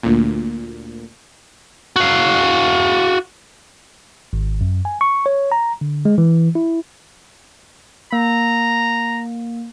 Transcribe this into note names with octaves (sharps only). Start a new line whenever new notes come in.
D2 A#2
F#4 F5
G#1
F#2
G#5
C#6
C#5
A#5
D3
G#3
E3
E4
A#3 A#5